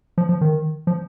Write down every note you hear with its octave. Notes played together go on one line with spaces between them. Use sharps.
F3
F3
D#3
F3